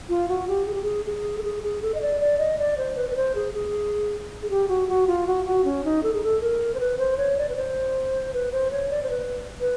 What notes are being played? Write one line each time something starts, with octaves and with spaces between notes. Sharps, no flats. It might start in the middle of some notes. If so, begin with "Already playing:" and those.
F4
F#4
G4
G#4
G4
G#4
G#4
A4
G#4
G#4
A4
D#5
D5
D5
D#5
D5
C5
B4
B4
C5
G#4
G#4
G#4
G4
F#4
F#4
F4
F#4
F#4
C#4
D#4
A4
G#4
A4
A#4
C5
B4
C5
C#5
D5
B4
C5
B4
C5
C#5
D5
C5
B4
B4